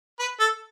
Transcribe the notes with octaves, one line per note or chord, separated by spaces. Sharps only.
B4
A4